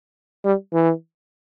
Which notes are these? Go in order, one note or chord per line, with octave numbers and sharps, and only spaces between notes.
G3
E3